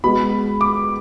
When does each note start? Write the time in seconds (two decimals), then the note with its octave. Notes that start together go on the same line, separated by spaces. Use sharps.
0.04 G#3 B3 F#4 B5
0.61 D6